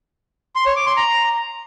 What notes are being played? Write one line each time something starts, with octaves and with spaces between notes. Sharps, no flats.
C6
C#5
D6
C6
A#5